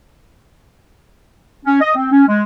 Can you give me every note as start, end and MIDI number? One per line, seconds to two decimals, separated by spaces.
1.66 1.80 61
1.81 1.94 75
1.95 2.10 60
2.12 2.23 61
2.28 2.43 56